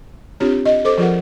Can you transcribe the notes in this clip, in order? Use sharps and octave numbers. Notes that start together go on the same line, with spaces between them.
C4 D4 F4 G4 C#5
D#5
A4 C5 D6
F3 F4 G#4 A#4 F#5